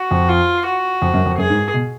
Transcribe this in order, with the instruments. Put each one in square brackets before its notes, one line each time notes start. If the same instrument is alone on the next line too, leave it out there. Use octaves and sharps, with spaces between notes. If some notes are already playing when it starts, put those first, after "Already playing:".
Already playing: [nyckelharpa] F#4
[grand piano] F2
[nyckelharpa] F4
F#4
[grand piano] F2
F#2
F2
[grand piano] F#2 [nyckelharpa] G#4
[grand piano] G#2
B2